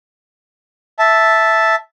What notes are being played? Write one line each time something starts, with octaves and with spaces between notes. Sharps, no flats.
E5 A5